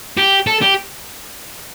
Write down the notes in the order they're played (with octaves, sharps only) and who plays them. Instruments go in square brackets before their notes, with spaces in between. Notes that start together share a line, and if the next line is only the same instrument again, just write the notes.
[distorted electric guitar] G4
A4
G4